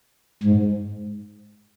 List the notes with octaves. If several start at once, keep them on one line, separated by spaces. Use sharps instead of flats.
G#2